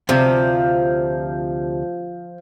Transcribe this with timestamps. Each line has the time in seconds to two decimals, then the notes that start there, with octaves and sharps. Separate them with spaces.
0.09 D2 C3 F3